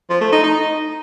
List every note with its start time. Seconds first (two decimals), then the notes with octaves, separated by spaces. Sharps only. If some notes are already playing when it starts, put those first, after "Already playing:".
0.10 F3
0.21 A3
0.32 D#4
0.43 D#4